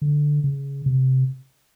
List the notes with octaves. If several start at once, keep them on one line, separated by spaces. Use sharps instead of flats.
D3
C#3
C3